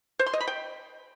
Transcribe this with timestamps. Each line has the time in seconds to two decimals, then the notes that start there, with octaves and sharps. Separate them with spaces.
0.19 C5
0.26 C6
0.33 D#5
0.40 B5
0.47 G5